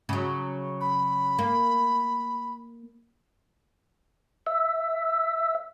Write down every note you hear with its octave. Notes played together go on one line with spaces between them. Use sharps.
C#3 F#3
B5
A#3
E5